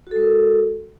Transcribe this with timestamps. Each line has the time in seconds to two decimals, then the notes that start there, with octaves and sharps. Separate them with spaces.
0.07 F#4
0.11 A4
0.16 G#3
0.21 A#4